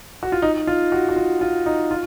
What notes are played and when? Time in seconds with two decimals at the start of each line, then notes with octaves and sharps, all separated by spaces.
0.23 F#4
0.32 F4
0.42 D#4
0.67 F4
0.92 F#4
1.09 F#4
1.16 F4
1.41 F4
1.66 D#4
1.91 F4